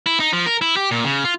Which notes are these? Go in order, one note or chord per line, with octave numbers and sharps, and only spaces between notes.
E4
D#4
F3
A#4
E4
G4
A#2
C#3
F4